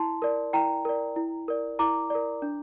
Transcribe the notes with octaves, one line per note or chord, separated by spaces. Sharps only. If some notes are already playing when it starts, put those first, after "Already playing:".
Already playing: E4 A5 C6
A#4 D5
E4 G5 A#5
A#4 D5
E4
A#4 D5
E4 A#5 D6
A#4 D5
D4